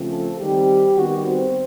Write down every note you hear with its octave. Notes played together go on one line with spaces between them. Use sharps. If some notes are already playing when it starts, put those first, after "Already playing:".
Already playing: C#3 F3 A3 C4
A4
D#3 G3 C4 G4
D#3 G3 B3 F#4
C4